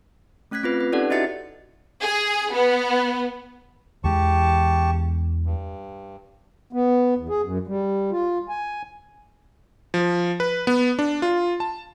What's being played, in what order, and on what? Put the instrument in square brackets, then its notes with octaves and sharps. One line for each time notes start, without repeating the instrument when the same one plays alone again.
[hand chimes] A3 C#4 F#6 G#6 B6
C4 F4 B4
B4
C#4 D#4 G4 A4 D5 F#5
E4 F#4 D#5 E5 A6 C#7
[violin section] G#4
B3
[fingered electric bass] E2 E3 G#3 [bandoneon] G4 A5 C#6
[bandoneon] G2
[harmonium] B3
E2
G#4
F#2
G3
F4
G#5
[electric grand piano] F3
B4
B3
D4
F4
A5